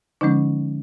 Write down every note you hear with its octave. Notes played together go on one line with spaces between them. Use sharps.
D3 F3 G#3 C#4 D#4